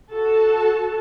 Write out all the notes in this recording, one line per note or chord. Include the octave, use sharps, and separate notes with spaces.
F#4 A4 A5